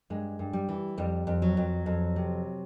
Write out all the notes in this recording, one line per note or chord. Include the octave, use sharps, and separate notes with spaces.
G2 G#3
G2
G3
E3
F2 G3
F2
F#3
F2
F2
C3